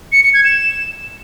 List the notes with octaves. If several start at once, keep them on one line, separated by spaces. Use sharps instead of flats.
C#7
C#7
G#6
E7